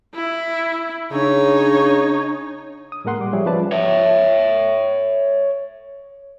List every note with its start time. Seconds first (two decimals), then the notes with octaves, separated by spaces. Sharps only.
0.14 E4
1.12 C#3 D4 D#4 C#5
2.92 D#6
3.05 A2 G#3 A#3 A#4 F#5 C6
3.20 G3 D6
3.33 F3 G3 G#4 C#5 E5
3.46 F3 C#4 B4 D5 A5
3.72 C#5 E5